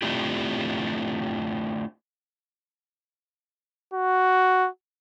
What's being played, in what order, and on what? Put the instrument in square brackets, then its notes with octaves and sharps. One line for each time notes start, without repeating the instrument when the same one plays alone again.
[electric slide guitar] A3 C4 D4 E4 F4 G4
[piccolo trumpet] F#4